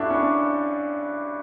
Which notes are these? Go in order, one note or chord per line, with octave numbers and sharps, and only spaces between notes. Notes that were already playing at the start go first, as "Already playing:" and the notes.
Already playing: G2 D4 E4 F#4 A4
C#4
D4